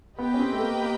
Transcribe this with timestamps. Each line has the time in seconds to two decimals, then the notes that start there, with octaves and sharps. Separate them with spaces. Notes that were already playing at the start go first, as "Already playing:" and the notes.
0.18 B3 G4 B4 D#5 G5
0.34 C#4
0.40 C4
0.52 A3
0.61 A#3
0.82 A#3